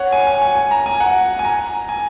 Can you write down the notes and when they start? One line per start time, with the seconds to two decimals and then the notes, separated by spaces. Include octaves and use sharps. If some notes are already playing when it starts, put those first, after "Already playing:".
Already playing: C#5 F#5
0.12 G#5
0.27 G#5
0.42 G#5
0.55 G#5
0.71 A#5
0.86 G#5
1.00 F#5
1.39 G#5
1.45 A#5
1.89 G#5